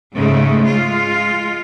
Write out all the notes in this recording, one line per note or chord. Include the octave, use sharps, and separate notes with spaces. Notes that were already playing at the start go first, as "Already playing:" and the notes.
G#2 C#3 G#3 A3
G#3 F4